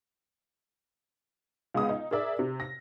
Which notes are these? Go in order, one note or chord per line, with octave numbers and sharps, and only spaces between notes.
C#2 G#3 B3 D#6
D#4
G#4 A#4 D5 E5
C3
A#6